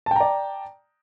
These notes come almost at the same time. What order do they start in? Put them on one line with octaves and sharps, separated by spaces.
A5 G5 A#5 D5